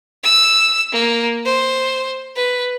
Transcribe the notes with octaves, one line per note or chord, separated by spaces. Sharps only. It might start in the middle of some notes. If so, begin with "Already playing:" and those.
E6
A#3
C5
B4